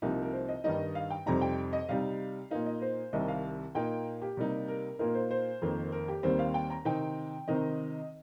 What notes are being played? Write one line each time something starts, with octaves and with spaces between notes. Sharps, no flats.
C2 C3 F3 A#3 D#4 G4
A#4
C5
D#5
G2 D#3 G3 D#4 D#5
F5
G5
F2 C3 G3 C4 D#4 A#5
G5
D#5
C3 G3 D#4 F5
A#2 A#3 D#4 F5
D#5
C5
C2 C3 D#3 G3 D#5
F5
A#2 A#3 D#4 G5
G4
C3 G3 A#3 D#4
A#4
A#2 A#3 D#4 A#4
C5
C5
F2 D#3 A#3
A#4
G4
D#2 D#3 G3 C4 C5
F5
G5
A#5
C3 D#3 C4 D#4 G5
C3 D#3 C4 D#4 D#5